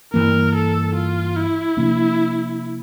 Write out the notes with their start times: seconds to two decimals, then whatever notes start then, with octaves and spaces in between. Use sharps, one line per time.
0.14 G2 E3 A#3 A#4
0.55 A4
0.95 F4
1.36 E4
1.77 C3 F3 A#3 D4